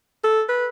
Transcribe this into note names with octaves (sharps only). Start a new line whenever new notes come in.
A4
B4